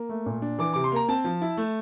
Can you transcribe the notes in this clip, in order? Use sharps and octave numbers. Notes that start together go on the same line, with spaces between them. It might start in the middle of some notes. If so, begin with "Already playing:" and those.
Already playing: A#3
A3
A#2
D4
E3 D6
C3 D6
C6
A#3 A#5
C4 A5
F3
E4
A3